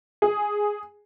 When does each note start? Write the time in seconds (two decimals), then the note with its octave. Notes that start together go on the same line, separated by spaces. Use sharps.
0.22 G#4